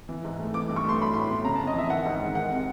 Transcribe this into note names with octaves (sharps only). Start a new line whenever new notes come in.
E3
G#2
A3
E3 D6
G2
C#6
A3 C6
F#3 B5
A2 C6
B3
C#3 A#5
A5
F2
D#5
E3 E5
D#3 F#5
G#2
G#3
D#3 F#5
C3